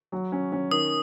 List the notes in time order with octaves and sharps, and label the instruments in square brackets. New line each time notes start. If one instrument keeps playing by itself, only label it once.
[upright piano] F#3
C#4
C#4
[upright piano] D#3 [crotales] D#6